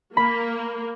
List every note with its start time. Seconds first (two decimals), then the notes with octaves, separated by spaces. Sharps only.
0.17 A#3 B5